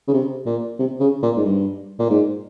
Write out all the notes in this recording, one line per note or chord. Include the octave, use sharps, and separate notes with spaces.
C#3
C3
A#2
C3
C#3
A#2
G#2
G2
A#2
G#2